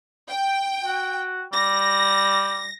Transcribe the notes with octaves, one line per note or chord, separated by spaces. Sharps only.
G5
F#4
G3 A#6